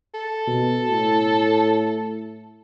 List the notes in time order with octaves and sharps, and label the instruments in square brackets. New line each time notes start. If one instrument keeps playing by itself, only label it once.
[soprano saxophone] A4
[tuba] B2
A2